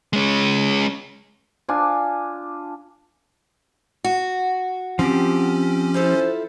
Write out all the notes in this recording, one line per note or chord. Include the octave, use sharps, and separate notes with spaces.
G#3 C#4
D4 F4 G#5
F#4
F3 C4 C#4 G4
E4 F4 A4 C5